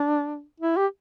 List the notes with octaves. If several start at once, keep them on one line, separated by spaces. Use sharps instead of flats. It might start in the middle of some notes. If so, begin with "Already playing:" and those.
Already playing: D4
E4
G4